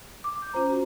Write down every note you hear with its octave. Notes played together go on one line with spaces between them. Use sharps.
D6
G6
C#4 F4 C5 A#5
F#4